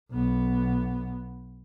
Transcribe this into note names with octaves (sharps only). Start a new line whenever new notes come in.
B1 B3